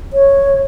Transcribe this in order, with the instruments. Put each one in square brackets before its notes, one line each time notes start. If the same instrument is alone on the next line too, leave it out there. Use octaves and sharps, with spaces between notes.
[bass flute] C#5